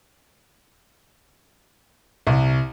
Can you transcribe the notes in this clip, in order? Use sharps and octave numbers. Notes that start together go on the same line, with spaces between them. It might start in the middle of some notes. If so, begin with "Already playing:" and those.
C2